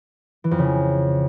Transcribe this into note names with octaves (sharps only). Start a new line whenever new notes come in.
E3
F2
C#3